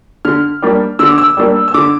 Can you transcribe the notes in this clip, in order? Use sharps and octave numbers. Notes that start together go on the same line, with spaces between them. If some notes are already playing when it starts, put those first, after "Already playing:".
D3 F6
G3 A#3 D4
D3 E6
D6
E6
G3 A#3 D4
E6
D3 D6